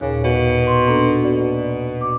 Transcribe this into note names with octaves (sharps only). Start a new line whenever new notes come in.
D#2 A#2 C#3
B2
C6
A#3 D4 A4
B2 D5
D6